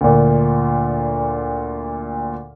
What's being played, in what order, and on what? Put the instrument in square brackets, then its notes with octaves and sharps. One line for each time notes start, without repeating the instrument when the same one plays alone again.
[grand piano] D2 A#2